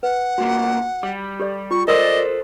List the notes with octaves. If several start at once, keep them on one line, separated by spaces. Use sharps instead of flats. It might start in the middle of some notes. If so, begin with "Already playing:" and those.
B4 F#5
C2 A#2 A#3 F#4
G3 D6
G4 A4 D5
F4 C#6
A4 A#4 C5 D5 D#5 D#6 E6